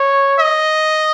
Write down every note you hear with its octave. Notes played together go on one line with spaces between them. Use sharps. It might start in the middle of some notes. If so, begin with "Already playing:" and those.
Already playing: C#5
D#5